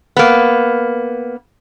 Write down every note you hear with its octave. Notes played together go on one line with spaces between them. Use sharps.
A#3 B3